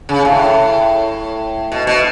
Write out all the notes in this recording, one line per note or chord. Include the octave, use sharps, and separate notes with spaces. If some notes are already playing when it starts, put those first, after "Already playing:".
C#3
A2
B2
B2